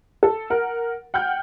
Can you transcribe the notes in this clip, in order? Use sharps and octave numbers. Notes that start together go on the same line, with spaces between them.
A4
A#4 F#5
F#5 G5 F6 G6